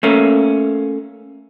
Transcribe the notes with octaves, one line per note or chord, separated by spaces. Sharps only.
A3 A#3 C#4